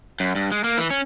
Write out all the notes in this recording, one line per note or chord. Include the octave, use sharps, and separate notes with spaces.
F#2
G2
G#3
A#3
E3
C#4